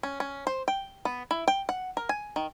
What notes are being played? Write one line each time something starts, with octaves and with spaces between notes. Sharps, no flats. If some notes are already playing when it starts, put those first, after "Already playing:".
C#4
C#4
C5
G5
B3
E4
G5
F#5
A#4
G#5
D#3